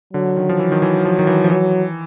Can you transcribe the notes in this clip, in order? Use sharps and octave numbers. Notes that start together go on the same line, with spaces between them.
D3 F#3
D#3
F3
E3
D#3
E3
F3
D#3
E3
F3
E3 F#3